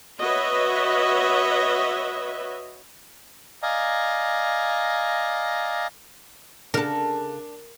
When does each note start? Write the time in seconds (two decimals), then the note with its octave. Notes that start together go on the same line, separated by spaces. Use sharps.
0.21 F#4 B4 C#5 D#5 E5
3.63 D5 D#5 F5 G#5 A#5
6.74 C#3 D4 A4 A#4